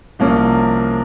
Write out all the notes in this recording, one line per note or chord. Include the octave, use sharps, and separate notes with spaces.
C2 C3 F3 A#3 C#4